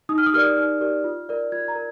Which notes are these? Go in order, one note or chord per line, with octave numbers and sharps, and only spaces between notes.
D#4 D#6
F6
D#6
G4 A#4 D5 F6
D#6
D#4 F6
G4 A#4 D5
F4
A#4 D5
F4 G#6
A#5
A#4